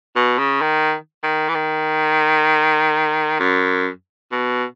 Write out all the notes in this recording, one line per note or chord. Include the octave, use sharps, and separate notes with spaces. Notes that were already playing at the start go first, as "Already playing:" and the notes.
B2
C#3
D#3
D#3
E3
D#3
F#2
B2